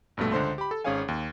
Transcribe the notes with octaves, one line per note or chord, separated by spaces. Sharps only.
A#1 G2 B2 A3
C#2 D3 C5 C6
G4 B5
A4
G#1 C#4 G#4 C#5 F5 G#5
D#2